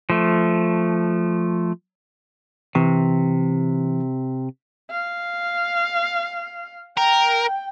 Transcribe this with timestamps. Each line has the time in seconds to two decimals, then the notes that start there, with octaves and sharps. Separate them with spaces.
0.10 F3 A3
2.75 C3 E3
4.91 F5
6.97 A#4 G5